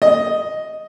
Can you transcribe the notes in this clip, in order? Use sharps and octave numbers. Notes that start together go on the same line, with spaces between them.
D#5